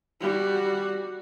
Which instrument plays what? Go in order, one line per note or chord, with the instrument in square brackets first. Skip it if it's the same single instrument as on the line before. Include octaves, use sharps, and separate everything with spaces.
[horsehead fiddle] G3 F#4